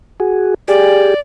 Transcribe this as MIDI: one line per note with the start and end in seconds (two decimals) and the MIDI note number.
0.20 0.54 66
0.20 0.54 68
0.68 1.14 67
0.68 1.14 68
0.68 1.20 74